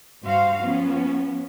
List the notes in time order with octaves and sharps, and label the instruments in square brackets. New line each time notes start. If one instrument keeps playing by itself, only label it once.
[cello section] G2 F#4 C5 F5
F3 B3 C#4